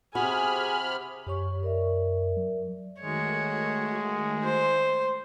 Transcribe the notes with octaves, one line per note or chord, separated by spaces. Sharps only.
C3 F#4 G#4 G#5 B5 F6
F#2 G4 C#5 C#6
A#4 D5 E5
F#3
D#3 G#3 A3 F#4 C#5
C5